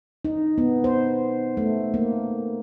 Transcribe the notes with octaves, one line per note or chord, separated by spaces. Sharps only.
D#4
B3
C5
A3
A#3